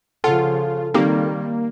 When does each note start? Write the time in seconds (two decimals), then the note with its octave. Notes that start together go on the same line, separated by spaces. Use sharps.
0.24 C#3 F3 F4 A4 F#5
0.94 D#3 G3 A#3 C4 D#4 G4